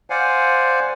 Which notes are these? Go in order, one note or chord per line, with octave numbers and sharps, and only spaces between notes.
C5 D5 F5 F#5 G#5